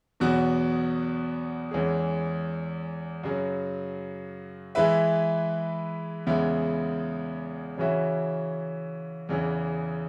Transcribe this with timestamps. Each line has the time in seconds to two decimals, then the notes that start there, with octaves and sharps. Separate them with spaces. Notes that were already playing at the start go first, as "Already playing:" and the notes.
0.20 E2 B2 F#3 B3 F#4
1.71 E2 E3 G#3 C#4 G#4
3.24 F#2 C#3 F#3
4.75 E3 G#3 E4 B4 E5
6.27 E2 C#3 G#3 B3 E4
7.78 C#3 E3 C#4 F#4 E5
9.29 E2 C#3 E3